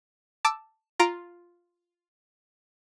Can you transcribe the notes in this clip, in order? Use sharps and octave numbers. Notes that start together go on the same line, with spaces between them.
A5 D6 E6
F4 A#5 D7